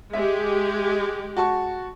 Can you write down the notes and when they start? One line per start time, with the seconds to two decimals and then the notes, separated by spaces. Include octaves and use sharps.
0.13 G#3 G4 E5
1.37 F#4 A5 C#6